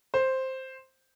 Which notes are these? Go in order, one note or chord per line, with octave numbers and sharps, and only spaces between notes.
C5